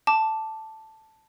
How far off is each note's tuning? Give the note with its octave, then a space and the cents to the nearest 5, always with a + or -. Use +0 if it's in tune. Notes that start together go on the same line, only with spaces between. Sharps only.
A5 +0 D6 +0